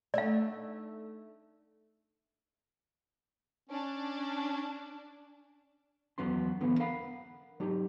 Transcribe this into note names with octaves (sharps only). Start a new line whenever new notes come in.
A3 D4 D#4 D5 F5
C#4 D4
E2 F#3 B3 C#4 C6
D3 E3 B3
A#4 F5 F#5 B5
F#3 D#4 G4